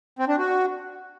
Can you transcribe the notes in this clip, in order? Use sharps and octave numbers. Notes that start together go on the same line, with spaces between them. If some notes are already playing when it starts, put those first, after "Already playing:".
C4
D4
F#4